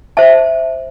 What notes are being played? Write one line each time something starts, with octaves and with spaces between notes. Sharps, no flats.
C5 E5 A5